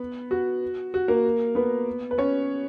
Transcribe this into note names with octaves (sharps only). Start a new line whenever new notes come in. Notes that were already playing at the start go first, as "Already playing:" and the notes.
Already playing: B3 B4
F#4
F#4
A#3 A#4
B3 B4
B4
C#4 C#5